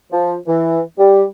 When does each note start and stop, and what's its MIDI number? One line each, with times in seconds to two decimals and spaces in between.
0.12 0.34 53
0.47 0.80 52
0.98 1.23 55